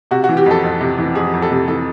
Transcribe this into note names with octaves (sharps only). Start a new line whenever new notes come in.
C3 F#4
F#4
E3
G4
F2 A4
F2
C3
E3
F2 G#4
F2
A4
C3
E3 A4